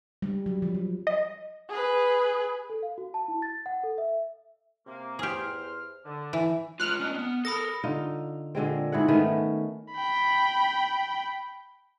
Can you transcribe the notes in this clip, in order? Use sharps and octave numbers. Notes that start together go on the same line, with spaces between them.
G3
F#3
F3
F#3
D#5
G#4 B4
A4
F5
F#4
A5
E4
A6
F#5
A4
E5
C3 A#3
E2 G4 G#4 C5 F6
D3
E3
G#3 F4 F6 F#6
C#4 D4 D#5
B3 C4
A4 A#4 B5 D#6 A#6
D3 D#4 F4
A#2 D3 G#3 C4
G#2 E4 G#4 F#5
D#3 A3 B3 C#4
G5 B5